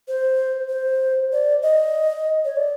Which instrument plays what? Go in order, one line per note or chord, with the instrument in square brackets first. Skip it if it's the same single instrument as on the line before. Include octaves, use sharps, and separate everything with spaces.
[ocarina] C5
C5
D5
D#5
C#5
D5